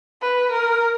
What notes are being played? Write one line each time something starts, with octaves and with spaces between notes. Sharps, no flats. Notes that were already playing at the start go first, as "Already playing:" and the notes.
B4
A#4